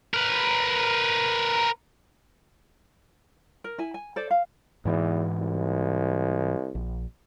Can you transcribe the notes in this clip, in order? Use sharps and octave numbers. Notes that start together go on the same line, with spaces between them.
A#4 B4
A#4
E4 G#5
G#5
A4 C5 D5
F5
E2 G#2 E3
C2
A#1